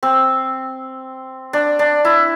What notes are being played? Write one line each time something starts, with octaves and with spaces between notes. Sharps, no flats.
C4
D4
D4
E4